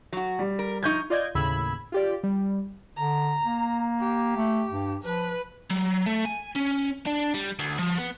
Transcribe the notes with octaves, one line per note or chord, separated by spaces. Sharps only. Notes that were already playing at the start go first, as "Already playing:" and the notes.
F#3 F#4
G3
A#4
F3 D#4 C#6 G6 G#6
F4 D5 D#5 G6 G#6
D#2 A2 C#3 B5 E6 G#6
F4 G4 D5
G3
D3 A#5
A#3
G4
A3
G2
F3 B4
F#3
A3
G#5
C#4
D4
G3
D2
F3
B3